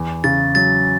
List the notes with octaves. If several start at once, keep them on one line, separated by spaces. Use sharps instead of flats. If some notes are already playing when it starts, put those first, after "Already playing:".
Already playing: E2
C#3 A6
F#3 A6